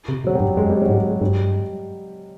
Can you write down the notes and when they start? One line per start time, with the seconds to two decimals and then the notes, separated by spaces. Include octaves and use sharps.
0.09 C3
0.24 B2 F#3
0.35 G3
0.40 G2
0.57 F#2 G#3
0.70 G3
0.82 F#3
0.89 G#2
0.94 G3
1.09 G#3
1.21 G2 G3